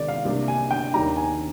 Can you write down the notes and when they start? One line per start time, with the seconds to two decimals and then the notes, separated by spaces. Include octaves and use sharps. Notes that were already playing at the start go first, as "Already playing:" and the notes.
Already playing: C3 D#3 G#3 D5
0.08 F5
0.25 C2 C3 G3 A#3 D4
0.48 G#5
0.71 G5
0.94 D#2 D#3 G3 D4 A#5
1.17 G#5